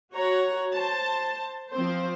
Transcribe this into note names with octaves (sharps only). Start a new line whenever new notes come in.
F#4 C#5 A#5
C5 A5
F3 C4 C5